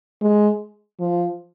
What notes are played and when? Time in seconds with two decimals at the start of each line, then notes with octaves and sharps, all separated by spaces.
0.22 G#3
1.00 F3